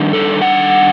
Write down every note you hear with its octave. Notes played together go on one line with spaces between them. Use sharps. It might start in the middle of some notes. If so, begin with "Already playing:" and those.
Already playing: D#3 G3 D4
A4
F#5